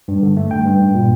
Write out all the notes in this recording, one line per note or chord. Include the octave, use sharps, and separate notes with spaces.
G2
D3
A3
G2 G5
G2
G2
A#2